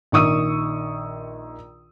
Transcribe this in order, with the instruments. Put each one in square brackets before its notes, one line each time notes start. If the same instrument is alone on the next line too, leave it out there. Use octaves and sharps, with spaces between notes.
[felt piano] A#1 D#3 C#6 D#6 E6 D#7